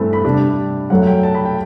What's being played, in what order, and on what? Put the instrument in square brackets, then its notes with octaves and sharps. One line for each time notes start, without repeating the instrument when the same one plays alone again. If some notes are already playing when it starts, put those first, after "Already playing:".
Already playing: [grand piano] G2 E3 A3 C4 A5 B5
B5
C3 G3 D4 A5
F#2 F#3 A3 F#5
G5
A5
B5
G5